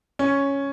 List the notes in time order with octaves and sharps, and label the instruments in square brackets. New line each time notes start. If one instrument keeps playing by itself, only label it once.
[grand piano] C#4